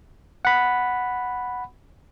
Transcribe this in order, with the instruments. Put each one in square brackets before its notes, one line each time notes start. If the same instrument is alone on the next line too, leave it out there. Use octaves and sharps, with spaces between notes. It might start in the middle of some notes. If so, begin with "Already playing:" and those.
[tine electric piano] F#5 B5